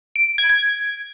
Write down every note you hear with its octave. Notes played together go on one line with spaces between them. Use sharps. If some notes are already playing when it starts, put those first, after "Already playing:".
D7
D7
G#6
G#6